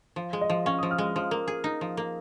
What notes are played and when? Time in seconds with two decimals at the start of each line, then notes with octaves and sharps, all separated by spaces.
0.16 F3
0.33 G#3
0.41 D#5
0.50 F3
0.66 C#4 F5
0.78 D#6
0.83 F3
0.91 F6
0.98 G#3 D#6
1.16 F3
1.31 A#3
1.48 G#4
1.64 D#4
1.81 F3
1.97 A#3